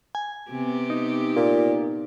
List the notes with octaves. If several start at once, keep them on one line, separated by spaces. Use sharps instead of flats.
G#5
C3 B3 G4
D#4
A#2